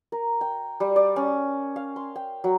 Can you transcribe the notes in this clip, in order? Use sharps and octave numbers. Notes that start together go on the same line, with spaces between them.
A#4
G5
G3
D5
C#4
F5
C6
G5
F#3